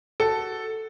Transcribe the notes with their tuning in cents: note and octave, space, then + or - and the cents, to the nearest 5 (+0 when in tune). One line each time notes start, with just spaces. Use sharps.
F#4 +20 A4 +0